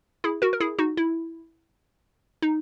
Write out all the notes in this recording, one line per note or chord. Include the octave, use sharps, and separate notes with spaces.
E4 G#4
F#4 A#4
A#4
E4 G#4
D#4 F#4
E4
D#4